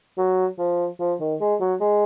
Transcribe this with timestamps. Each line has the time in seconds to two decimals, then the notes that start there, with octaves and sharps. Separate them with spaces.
0.17 F#3
0.58 F3
1.00 F3
1.20 D#3
1.40 G#3
1.60 F#3
1.80 G#3